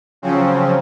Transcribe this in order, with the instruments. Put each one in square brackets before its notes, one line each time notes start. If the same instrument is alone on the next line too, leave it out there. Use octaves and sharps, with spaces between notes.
[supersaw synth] C#3 F3 F#3 C4 C#4